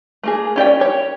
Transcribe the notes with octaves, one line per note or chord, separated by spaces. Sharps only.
A3 A#3 G#4
C#4 G4 D5 G5
G4 C#5